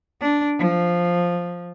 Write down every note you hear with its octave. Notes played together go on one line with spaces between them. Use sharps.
D4
F3